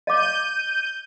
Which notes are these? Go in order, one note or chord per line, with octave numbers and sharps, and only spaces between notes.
D#5 F5 D6 G6 D#7